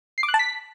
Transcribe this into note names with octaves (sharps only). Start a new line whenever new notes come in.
C7
D6
F#6
A5
B6